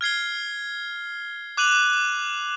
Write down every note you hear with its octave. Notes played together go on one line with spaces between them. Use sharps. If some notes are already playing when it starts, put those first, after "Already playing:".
F6 G#6 C7 G7
D6 F#6 D#7 F7 F#7